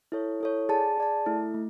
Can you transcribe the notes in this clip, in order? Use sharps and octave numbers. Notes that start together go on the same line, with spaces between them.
E4 A4 C#5
E4 A4 C#5
G#4 D5 A5
G#4 D5 A5
A3 E4 A4
A3